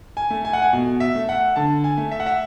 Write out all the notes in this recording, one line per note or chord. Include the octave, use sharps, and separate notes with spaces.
G#5
A3
G#5
F#5
G#5
B2
E5
A3
F#5
D3 A5
G#5
A3
E5
F#5
E5